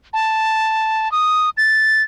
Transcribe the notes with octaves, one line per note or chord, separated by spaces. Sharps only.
A5
D#6
A6